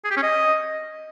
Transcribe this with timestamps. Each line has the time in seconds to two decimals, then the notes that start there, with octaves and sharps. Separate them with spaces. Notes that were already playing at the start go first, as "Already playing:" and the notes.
0.05 G#4
0.11 G4
0.17 C#4
0.23 D#5